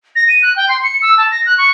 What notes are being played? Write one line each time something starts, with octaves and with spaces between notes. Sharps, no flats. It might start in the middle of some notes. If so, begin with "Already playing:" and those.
A#6
D#7
F#6
G5
C6
C#7
E6
A5
A#6
F#6
C#6